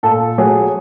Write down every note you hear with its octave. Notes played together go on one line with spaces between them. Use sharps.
A#2 A4
F#3 G#4